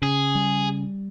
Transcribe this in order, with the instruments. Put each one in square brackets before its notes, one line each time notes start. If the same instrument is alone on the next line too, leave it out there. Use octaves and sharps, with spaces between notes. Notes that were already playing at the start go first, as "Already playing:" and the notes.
[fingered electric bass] C#3 [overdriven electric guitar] G#4
[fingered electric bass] G3